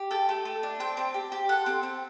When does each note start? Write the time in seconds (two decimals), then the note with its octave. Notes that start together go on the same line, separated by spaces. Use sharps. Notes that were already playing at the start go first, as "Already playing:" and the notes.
Already playing: G4
0.11 A4 G5
0.29 A3
0.45 A3
0.63 D4
0.80 C4 G5
0.97 C4
1.14 G4
1.32 G4
1.49 A4 F#5
1.66 C4
1.83 C4